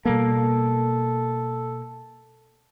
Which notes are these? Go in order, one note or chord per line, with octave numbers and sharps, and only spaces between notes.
B2 G3 A#3 A4